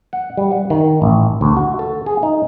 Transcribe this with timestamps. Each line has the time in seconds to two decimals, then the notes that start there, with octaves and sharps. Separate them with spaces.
0.13 F#5
0.37 G3
0.52 F#5
0.70 D#3
1.02 A1
1.41 D2
1.57 F#4
1.79 A4
2.06 G#4
2.23 D#4